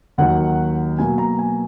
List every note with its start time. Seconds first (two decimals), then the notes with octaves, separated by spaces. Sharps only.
0.18 D#2 D#3 F#3 F#5
0.98 B2 F#3 A#3 G#5
1.18 A#5
1.39 G#5